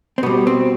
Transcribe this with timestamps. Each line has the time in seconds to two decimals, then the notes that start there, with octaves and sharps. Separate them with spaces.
0.18 C4
0.23 B2 G3 B3
0.47 C4